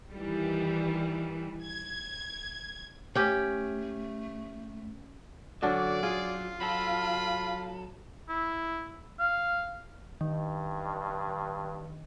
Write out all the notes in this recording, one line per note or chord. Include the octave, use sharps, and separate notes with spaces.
D#3 E3 G3
G#6
A3 C#4 G4
D3 F#3 C#4 D4 F#4 D5
F4 G#4
F#3 A4 B5
E4
F5
G2 D#3